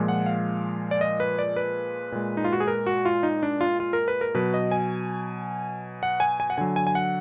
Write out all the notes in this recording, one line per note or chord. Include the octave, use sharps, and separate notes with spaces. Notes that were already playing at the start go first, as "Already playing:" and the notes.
Already playing: A#2 F3 G#3
F#5
F5
D5
D#5
B4
D5
B4
A#2 G#3
D#4
F4
F#4
G#4
A#4
F#4
F4
D#4
D4
F4
F4
A#4
B4
A#4
B2 F#3 B4
D#5
G#5
F#5
G#5
G#5
F#5
D3 F#3 G#5
G#5
G#5
F#5